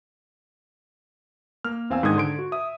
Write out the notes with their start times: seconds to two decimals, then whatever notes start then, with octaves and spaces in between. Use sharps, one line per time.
1.64 A#3 F6
1.90 E2 C4 F5 G#5 E6
2.03 G#2 D#3 D4 D#6 G#6
2.16 D3 C6 D7
2.39 F#4
2.52 E5 D#6